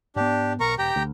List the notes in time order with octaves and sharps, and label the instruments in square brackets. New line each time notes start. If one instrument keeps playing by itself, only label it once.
[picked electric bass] G#2 B3 [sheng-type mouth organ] D4 G4
[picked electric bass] B1 [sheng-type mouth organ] A#4 A#5 C#6
[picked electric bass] E1 [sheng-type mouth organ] G4 G5 A#5
[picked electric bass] D2